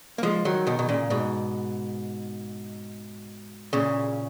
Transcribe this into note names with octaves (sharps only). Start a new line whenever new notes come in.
A#3
F3 G#3
D#3 F#3
B2 D#3
B2
A#2 C#3
G#2 B2
A#2 C#3